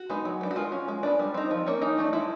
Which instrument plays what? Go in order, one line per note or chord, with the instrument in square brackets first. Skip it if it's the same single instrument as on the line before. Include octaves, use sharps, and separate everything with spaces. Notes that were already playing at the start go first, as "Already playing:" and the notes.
Already playing: [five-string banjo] F#4
G#3 B3 D#4
F#3
B3 D4
F#4
G#3 F4
C#4
G#3
B3 D4
G3
C4 D#4
F3
A#3 C#4
E3 D#4
A3 D4
G#3 E4